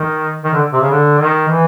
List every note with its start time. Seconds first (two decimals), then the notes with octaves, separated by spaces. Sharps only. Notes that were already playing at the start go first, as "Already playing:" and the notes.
Already playing: D#3
0.44 D#3
0.53 D3
0.73 C3
0.81 C#3
0.91 D3
1.19 D#3
1.48 E3